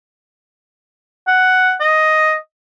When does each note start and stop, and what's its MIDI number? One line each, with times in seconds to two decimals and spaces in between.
1.27 1.74 78
1.80 2.35 75